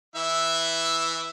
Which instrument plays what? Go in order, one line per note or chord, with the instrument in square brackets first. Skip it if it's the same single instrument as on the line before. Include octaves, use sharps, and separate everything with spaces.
[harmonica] E3 E4 E5